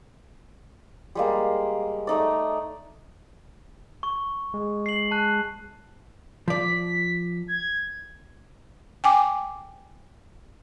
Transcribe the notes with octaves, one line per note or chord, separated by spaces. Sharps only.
G3 G#3 A#3
A3 D#4 D5
C#6
G#3
C7 F#7
A5 F#6
F3 D5 B6
G#6
G5 G#5 D6